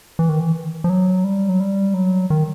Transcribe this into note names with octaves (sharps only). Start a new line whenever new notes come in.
E3
D#3
E3
F3
F#3
G3
F#3
G3
F#3
D#3